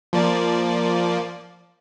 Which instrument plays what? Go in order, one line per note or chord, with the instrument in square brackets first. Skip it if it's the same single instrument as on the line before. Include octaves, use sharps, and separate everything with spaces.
[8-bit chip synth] F3 A#3 D5